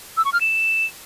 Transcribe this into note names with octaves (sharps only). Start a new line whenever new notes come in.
E6
C#6
F6
E7